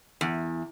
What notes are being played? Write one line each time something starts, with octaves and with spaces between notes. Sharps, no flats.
E2